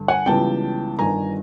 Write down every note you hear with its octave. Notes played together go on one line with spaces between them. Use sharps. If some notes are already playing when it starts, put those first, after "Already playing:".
Already playing: G2 D3
F#5 G#5
C#2 C#3 E3 G3 B3 G5 A5
G1 G2 D#3 G#5 A#5